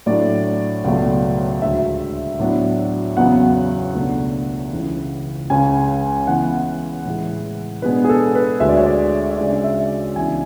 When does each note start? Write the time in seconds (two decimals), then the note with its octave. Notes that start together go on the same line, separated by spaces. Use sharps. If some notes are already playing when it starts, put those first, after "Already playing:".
0.06 A2 F#3 A3 D4 D5
0.84 C#2 B2 F#3 A3
1.61 D2 D3 G#3 E5
2.39 A2 F#3 B3 D4
3.17 E2 C#3 F#3 B3 F#5
3.94 C#2 B2 A3 D4
4.73 C#2 C#3 E3 G#3
5.50 C#2 C#3 G#3 C#4 G#5
6.27 C#3 E3 B3 F#5
7.05 A2 E3 G#3
7.82 B2 G#3 B3 D4 B4
8.04 G#4
8.09 A4
8.35 B4
8.60 D2 D3 G#3 E5
8.68 D5
8.77 C#5
8.86 D5
9.30 E5
9.38 C#3 G#3 D4 D5
9.64 E5
10.16 C#2 C#3 E3 B3 D4 G#5